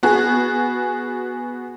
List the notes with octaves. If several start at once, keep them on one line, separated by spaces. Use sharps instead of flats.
B3 F#4 G#4